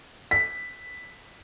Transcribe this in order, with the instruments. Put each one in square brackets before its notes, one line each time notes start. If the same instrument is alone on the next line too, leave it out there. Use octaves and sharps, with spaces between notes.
[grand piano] B6